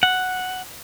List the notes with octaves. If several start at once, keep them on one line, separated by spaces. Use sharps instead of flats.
F#5